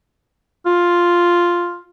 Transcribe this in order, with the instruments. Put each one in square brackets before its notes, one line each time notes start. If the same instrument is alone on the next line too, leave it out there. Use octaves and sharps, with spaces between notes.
[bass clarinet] F4